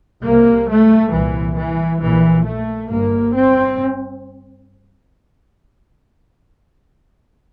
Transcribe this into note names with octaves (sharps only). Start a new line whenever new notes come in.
C2 C3 A#3
A3
C2 A#2 E3
E3
A#1 A#2 E3
A3
G1 G2 A#3
C4